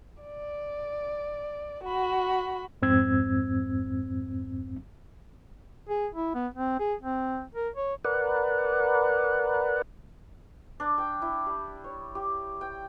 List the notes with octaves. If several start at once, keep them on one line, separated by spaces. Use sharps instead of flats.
D5
F#4 B5
F2 G#2 C4 E6 G#6
G#4
E4
B3
C4
G#4
C4
A#4
C#5
A#4 B4 D5 F#5
D4
G5
E4
G3
C#5
G4
G5